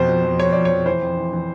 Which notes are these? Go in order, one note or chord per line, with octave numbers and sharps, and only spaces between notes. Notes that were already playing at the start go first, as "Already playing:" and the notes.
Already playing: F2 B2 C5
F3
F2
F2 C#5
F3 D5
C#5
F2
E3 C5
F2
E3
E3